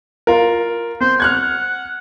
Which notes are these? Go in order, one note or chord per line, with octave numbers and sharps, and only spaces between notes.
F4 A#4
C4 C5
F#5 F6 F#6 G#6